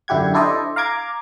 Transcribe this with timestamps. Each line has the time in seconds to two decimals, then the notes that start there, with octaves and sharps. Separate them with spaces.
0.08 F#2 D3 E4 G4 F#5 G#6
0.34 D4 E4 A4 C5 D5 D#5
0.76 F5 A#5 D6 G#6